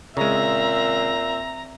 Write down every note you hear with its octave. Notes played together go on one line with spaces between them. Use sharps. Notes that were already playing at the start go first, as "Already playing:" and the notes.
A#2 C#3 G#3 C4 E5 A#5